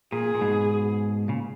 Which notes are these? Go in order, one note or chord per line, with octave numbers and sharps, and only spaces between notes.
A#2 G#4
A#2
G#2 B2
A#2 C#3